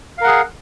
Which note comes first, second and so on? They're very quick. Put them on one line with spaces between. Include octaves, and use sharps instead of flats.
F5 A#4 F#5 G#4